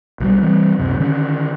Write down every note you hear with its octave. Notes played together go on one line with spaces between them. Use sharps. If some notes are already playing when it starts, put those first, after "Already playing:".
B1 F#3 G3
E3 G3 C4
C#2 F#2 C3
D3 D#3 C#4